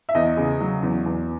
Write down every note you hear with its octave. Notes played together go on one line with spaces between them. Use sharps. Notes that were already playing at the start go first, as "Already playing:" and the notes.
E5
E2 D#5
C#3
F#3
E2
E2